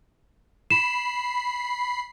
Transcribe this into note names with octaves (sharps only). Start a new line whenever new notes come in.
B5 C7 E7